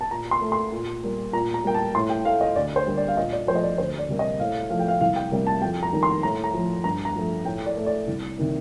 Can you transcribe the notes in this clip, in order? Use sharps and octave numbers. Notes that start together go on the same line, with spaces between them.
A5
A#2 A#5
C6
A3
C6
A#2
G3 A#3
A#2 A#5
A#5
G3 A#3 G5
A5
A2 C6
G5
A3 F5
D#5
D2 D5
C5
D3 G3 A#3
D5
F5
A#2 D#5
D5
F3 A3 C5
D#5
D5
D2 C5
D5
C3 G3 A#3
D#5
A2 F5
F3 A3 F5
G5
F5
C2 F5
G5
C3 G3 A#3
A5
F2 G5
A#5
D#3 G3 A#3
C6
A2 A#5
A#5
F3 A3
G2 A#5
A#5
F3 A3
A2 G5
D5
A3
D5
C2
C3 D#3 A#3